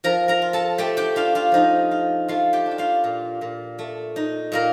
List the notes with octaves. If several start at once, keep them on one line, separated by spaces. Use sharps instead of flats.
F3 A#4 A#5
A#4 A#5
F4
A4 A5
A3 G4 G5
G4 G5
D4 F4 F5
F4 F5
F3 D#4 D#5
F4
A3 F4 F5
G4 G5
D4
G5
F4 F5
A#2
A#2
A3
D#4
A#2 A#3 A#4